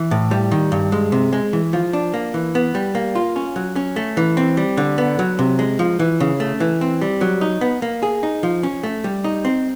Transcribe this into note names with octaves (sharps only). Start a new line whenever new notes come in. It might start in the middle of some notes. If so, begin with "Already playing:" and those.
Already playing: E3
A2
G3
D#3
G2
G#3
C3
G#3
E3
F3
D4
A#3
E3
B3
G3
A#3
F4
C#4
F#3
C#4
A3
E3
C4
G3
D3
B3
F#3
C3
G#3
F3
E3
C#3
A3
E3
C4
G3
F#3
D#4
B3
A#3
G#4
D#4
F3
C#4
A3
G3
D#4
C4